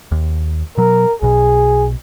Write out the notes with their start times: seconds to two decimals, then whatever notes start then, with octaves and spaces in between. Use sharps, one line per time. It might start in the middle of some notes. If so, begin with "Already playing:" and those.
0.12 D#2
0.78 B2 F#3 A#4
1.22 B1 B2 G#4